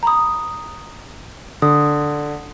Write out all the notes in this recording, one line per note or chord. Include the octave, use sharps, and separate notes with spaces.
A#5 B5 D#6
D3 D#6